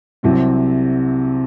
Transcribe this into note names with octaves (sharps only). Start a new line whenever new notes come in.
C2 C3 F#3 C4